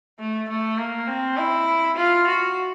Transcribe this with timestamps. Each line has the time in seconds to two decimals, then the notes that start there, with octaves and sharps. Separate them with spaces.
0.19 A3
0.49 A3
0.78 A#3
1.08 C4
1.37 E4
1.97 F4
2.27 F#4